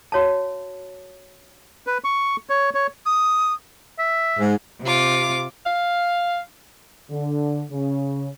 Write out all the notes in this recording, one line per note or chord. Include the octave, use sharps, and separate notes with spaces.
F#4 C#5 F5 A5
B4
C#6
C#5
C#5
D#6
E5
G#2
C3 F4 D6
F5
D3
C#3